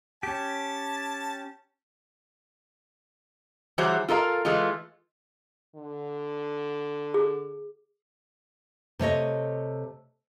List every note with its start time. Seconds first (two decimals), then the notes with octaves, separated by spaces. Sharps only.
0.23 C#4 G4 A5
3.78 E3 F#3 G3 F#4 G#4 C5
4.09 F4 A4 A#4 D#5 F5
4.45 E3 G#3 A3 F4
5.75 D3
7.14 G#4
8.99 C3 A3 C#5 D#5